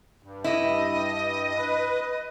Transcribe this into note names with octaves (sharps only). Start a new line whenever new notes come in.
G2
E4 D#5
B4